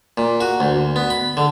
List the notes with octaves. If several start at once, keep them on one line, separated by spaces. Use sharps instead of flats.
A#2
F#4
D2
B3
B5
D3